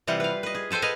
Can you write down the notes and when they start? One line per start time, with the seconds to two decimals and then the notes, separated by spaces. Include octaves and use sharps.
0.07 C3 E3 G3 F4 F#5
0.20 B4 F5
0.43 B4 D#5
0.55 G#4
0.70 G#4 A4 C5 G5 G#5
0.82 B4 D#5 F5 G#5